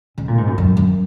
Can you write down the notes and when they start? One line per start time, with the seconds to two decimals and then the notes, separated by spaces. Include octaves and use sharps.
0.18 C#3
0.28 A#2
0.38 G#2
0.47 F#2
0.58 F#2
0.77 F#2